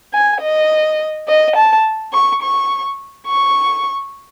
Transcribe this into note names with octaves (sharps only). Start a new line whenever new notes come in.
G#5
D#5
D#5
A5
C#6
C#6
C#6